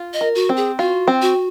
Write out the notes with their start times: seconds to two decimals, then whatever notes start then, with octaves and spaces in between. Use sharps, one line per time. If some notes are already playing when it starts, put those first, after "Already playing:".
Already playing: F4
0.13 D#5
0.21 A#4
0.35 F#4
0.49 C4
0.56 G#4
0.78 F4 F#4
1.08 C4
1.22 F#4